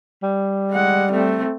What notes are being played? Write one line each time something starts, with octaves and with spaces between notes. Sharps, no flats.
G3
G#3 F#5
A3 C4